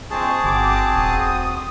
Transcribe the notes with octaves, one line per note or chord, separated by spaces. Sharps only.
A#1 G#3 C4 G#4 A5 C#6
G1 C4 F#4 D6
D#1 D#6